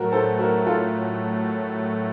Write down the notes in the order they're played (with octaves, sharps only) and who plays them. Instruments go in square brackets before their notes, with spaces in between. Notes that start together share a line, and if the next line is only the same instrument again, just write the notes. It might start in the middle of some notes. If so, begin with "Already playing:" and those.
Already playing: [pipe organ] A2 F#3 A3 [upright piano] F#4 A#4
[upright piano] A4 C5
F#4 A#4
F4 A4